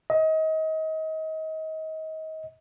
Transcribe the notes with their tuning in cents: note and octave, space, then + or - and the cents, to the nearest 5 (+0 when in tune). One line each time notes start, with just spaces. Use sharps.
D#5 +30